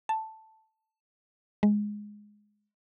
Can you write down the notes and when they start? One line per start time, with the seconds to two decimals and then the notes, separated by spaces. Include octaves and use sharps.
0.09 A5
1.63 G#3